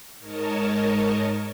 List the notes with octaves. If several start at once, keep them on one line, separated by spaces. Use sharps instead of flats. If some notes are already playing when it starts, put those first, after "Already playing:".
G#2 A#4 C#5 D#5 A5